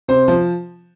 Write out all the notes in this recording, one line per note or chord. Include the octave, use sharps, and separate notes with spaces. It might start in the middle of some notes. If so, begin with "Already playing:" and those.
C3 C5
F3